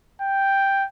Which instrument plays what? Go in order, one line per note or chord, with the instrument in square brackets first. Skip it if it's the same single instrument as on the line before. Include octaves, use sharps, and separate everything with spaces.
[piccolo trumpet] G5